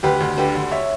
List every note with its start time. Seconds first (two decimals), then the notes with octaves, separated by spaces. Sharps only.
0.03 D2 G4 B4
0.20 D2
0.37 D3 G4 B4
0.55 D2
0.71 C#5 E5